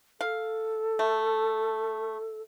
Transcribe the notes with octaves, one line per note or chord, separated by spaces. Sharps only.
A4 F5
A3